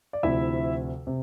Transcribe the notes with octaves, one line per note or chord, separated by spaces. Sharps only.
D5
D2 C3 F3 E4 E5
C3